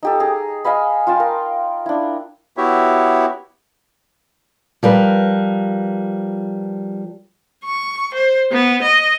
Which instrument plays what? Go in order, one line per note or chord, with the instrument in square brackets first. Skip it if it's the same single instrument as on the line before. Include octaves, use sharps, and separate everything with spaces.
[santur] D#4 G4 A4
G#4 A#5
D#5 F5 G#5 B5
F4 G5 A5
A#4
D4 E4
[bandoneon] B3 E4 F#4 G4 C#5 E5
[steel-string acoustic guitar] F3 G3 A#4 B4
[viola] C#6
C5
B3
D#5